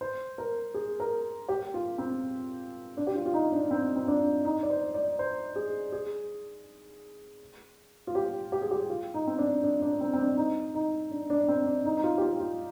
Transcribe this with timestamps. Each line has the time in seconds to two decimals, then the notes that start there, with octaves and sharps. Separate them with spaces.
0.01 C5
0.38 A#4
0.74 G#4
1.00 A#4
1.48 G4
1.74 F4
1.98 C4
2.97 D4
3.07 G4
3.15 F4
3.26 F4
3.34 D#4
3.52 D4
3.71 C4
3.96 C4
4.08 D4
4.45 D#4
4.63 D5
4.70 C5
4.94 D5
5.19 C5
5.56 G#4
5.92 G#4
8.07 F4
8.15 G4
8.52 G4
8.62 G#4
8.71 G4
8.90 F4
9.14 D#4
9.27 C4
9.38 D4
9.63 D4
9.82 D4
10.01 C4
10.13 C4
10.19 D4
10.37 D#4
10.74 D#4
11.11 D4
11.30 D4
11.48 C4
11.66 D4
11.85 D#4
11.97 D#4
12.03 F4
12.18 G4
12.22 F4
12.40 F4